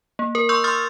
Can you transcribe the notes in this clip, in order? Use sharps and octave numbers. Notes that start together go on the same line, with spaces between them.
A#3
A#4
C6 C#6 E6 G6
C6 D#6 F6 A6